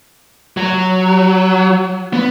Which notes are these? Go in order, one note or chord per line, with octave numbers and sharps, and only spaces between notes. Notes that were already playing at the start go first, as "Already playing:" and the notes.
F#3
B3